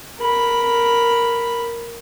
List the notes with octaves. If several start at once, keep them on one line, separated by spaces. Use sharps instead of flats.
A#4 B5